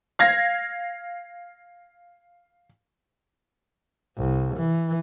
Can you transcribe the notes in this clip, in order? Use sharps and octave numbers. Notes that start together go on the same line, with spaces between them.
F5 G#6 A#6
C2
E3